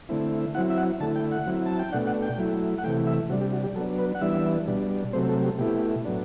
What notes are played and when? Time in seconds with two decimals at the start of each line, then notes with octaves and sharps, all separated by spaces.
0.09 D3 A3 C4 E4
0.54 F#3 C4 E4 F#5
0.70 E5
0.78 F#5
1.00 D3 A3 E4 A5
1.16 G5
1.32 F#5
1.46 F#3 C4 E4
1.66 A5
1.79 G5
1.92 B2 A3 D4 F#5
2.07 F#5
2.22 G5
2.38 F#3 A3 E4
2.78 F#5
2.84 C3 E3 A3 G5
3.07 E5
3.30 C3 G3 D4 F#4
3.41 G4
3.52 F#4
3.64 G4
3.76 F#3 B3 D4 A4
3.99 B4
4.15 F#5
4.21 E3 G3 B3 D4 E5
4.67 B2 G3 D4
5.13 C3 F#3 A3 C4 C5
5.29 A4
5.44 G4
5.59 B2 A3 E4 G4
6.05 A2 F#3 B3 D4